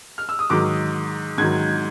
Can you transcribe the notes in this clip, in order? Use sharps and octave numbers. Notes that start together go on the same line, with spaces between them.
F6
E6
D#6
G#2 D#3 F#3 D6
G#2 D#3 F#3 G#6